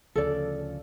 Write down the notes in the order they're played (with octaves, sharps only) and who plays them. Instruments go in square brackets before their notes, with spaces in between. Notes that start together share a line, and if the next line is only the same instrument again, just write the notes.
[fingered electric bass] D2 C#3 F3 [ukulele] A4 D5